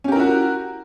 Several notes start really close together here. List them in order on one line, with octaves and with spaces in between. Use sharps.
C#4 G4 A#4 E4 F#4